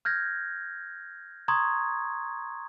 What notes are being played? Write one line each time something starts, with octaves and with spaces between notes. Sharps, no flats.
F6 G6 G#6 A#6
A#5 C6 C#6 D#6 G#6